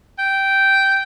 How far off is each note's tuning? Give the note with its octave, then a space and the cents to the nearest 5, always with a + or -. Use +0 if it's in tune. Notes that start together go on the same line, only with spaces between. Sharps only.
G5 -10